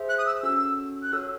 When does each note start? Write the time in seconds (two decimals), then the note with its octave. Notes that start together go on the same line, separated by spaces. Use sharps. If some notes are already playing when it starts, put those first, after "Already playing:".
Already playing: G#4 C5 E5
0.09 F#6
0.18 D#6
0.26 E6
0.43 C#4 F#4 A4 E6
1.02 F#6
1.12 F#4 A4 C#5 E6